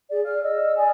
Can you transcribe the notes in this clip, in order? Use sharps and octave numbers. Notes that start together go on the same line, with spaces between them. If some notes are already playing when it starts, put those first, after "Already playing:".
G#4 D5
F5 F6
D#5 E6
D5 G#5 D#6